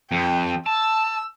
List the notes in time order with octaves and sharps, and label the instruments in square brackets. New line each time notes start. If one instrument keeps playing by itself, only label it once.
[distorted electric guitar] F2 [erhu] G5
[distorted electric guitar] A5 [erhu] E6